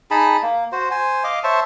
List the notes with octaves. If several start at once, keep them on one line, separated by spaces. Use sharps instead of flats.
D#4 G#4 A5 B5
A#3
F#4 C5
C5 G#5
D#5 F5 D6
C5 C#5 E5 A5